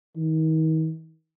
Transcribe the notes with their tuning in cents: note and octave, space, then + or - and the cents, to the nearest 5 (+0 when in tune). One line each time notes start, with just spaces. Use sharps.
D#3 +35